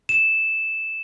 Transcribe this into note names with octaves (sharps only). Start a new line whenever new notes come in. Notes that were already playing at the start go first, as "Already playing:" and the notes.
E7